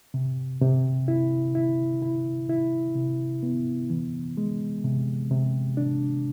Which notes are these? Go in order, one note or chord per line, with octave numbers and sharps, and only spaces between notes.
C3
C3
E4
E4
E4
E4
C3
B3
E3
G#3
C3
C3
D4